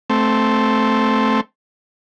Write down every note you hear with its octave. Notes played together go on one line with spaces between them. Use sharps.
A3 C4